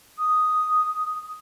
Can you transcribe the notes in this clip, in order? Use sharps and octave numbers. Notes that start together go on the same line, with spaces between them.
D#6